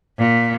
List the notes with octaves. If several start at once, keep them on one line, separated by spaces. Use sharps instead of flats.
A#2